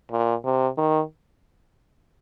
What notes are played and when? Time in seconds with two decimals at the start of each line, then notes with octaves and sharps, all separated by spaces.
0.11 A#2
0.45 C3
0.78 D#3